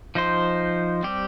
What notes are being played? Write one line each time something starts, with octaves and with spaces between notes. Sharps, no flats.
F3 D#4 C5
G3 C4 G4